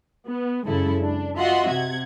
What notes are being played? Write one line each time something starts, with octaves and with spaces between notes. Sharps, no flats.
B3
F#2 C#3 G#3 E4 A4
D4
F4 F#4 D#5 E5 F#5 C6
C3 F#5 G#6